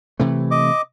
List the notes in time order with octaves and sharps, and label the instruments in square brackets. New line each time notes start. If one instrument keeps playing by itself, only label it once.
[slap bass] C3 E3 A3
[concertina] D#5 D6